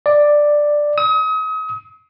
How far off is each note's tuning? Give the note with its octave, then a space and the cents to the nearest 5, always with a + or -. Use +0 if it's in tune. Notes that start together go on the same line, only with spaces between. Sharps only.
D5 +5
D#6 +35